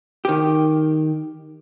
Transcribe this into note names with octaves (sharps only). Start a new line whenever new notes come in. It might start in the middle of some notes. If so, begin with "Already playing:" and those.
D#3 G4